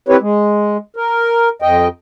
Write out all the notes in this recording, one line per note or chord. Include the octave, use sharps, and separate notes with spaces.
C4 E4 G4 B4 C#5
G#3
A#4
F2 D#5 G5